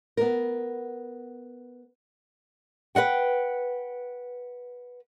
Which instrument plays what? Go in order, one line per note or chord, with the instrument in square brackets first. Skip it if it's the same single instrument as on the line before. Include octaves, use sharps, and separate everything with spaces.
[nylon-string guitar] B3 A#4
[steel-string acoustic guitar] B4 D#5 F#5 G5